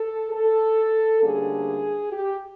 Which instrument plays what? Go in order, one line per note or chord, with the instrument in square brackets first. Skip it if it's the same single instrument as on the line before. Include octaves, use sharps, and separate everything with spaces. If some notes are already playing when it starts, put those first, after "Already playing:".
Already playing: [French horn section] A4
A4
D2 D3 G3 A#3 C#4 G#4
G4